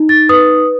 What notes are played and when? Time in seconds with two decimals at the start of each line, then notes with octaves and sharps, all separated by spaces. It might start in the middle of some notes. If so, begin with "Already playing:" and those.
Already playing: D#4
0.09 A6
0.29 B4 D#6